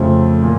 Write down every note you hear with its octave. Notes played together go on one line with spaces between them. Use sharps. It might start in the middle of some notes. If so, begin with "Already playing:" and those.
Already playing: F2 C#3 F3 A3
A#2